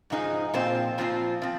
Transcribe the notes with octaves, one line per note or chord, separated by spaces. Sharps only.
G#2 F3 G#3 D#4 G#4
A#2 F3 C4 F4 C5
A#2 F3 C4 F4 C5
F3 C4